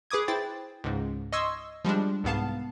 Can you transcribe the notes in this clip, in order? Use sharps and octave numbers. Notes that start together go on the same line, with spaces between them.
G#4 B4 D6 D#6 G#6
E4 C5 G5 A6
C#2 G#2
D#5 C6 C#6 D#6 E6 G#6
F3 G3 G#3 D4
C2 G#2 B3 F5 A5